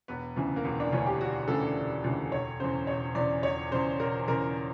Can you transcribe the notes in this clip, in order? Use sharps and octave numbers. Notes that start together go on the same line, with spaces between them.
E1 B3
D2 C#3 E3
A#3
E1 B3
D4
D2 C#3 E3 C#4
G4
E1 F#4
D2 C#3 E3 A4
E1
D2 C#3 E3
E1 C#5
E2 C#3 C5
E1 C#5
E2 C#3 D5
E1 C#5
E2 C#3 C5
E1 A#4
E2 C#3 A#4